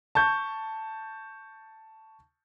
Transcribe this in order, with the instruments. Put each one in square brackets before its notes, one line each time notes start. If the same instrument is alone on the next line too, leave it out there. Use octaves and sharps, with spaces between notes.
[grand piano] A5 C#6 G6